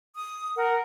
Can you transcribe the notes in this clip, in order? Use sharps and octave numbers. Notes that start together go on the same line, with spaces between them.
D#6
A#4 F#5